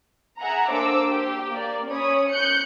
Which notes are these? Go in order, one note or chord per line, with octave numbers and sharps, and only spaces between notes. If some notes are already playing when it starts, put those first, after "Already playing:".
G#4 E5 F#5 G#5 A#5
A#3 D4 A4 C5 D6 E6
G4
A#3 D5
C#4 C#5 B5 D#6
F#6 G6 C#7